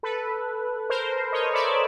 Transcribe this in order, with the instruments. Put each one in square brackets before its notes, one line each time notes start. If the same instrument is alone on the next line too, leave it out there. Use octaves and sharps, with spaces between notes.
[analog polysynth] A4 B4
A#4 C5
C#5 D#5
D5 E5